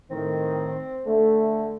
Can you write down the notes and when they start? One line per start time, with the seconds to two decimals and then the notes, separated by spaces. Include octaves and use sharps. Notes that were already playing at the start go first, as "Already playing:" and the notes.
0.10 A2 D#3 C4
1.06 D3 A3